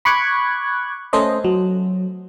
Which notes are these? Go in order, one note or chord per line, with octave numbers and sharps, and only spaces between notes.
B5 C#6 D6 F#6 G#6
A3 C#4 A4 C5 D#5
F#3